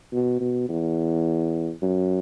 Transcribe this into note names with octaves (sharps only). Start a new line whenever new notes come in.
B2
B2
E2
F#2